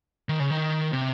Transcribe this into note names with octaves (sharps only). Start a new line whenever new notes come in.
D#3
C#3
D#3
C3